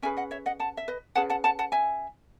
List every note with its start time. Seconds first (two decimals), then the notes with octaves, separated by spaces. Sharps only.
0.02 C#4 G#4 B4 E5 G#5
0.17 D#5 F#5
0.31 C#5 E5
0.46 D#5 F#5
0.59 F#5 A5
0.77 E5
0.88 B4 D#5
1.15 C#4 G#4 B4 F#5 A5
1.30 F#5 A5
1.44 F#5 A5
1.59 F#5 A5
1.72 E5 G#5